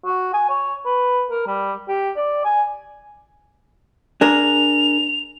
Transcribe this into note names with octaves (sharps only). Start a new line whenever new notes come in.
F#4
G#5
C#5
B4
A#4
G3
G4
D5
G#5
D4 G#4 A#4 F7